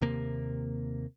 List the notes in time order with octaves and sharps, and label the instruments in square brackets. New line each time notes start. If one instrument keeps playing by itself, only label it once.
[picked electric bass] D#2 C3 A#3